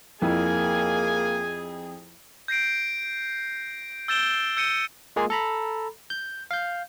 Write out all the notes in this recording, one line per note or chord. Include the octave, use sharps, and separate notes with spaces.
F2 A#3 E4 G#4 G#5
G6 A#6 C7 D7
E6 G6 A6 D7 E7 G7
E6 G6 C#7 D#7
G#3 A#3 F4 G#4
A4 A#5 B5
G6
F5 G6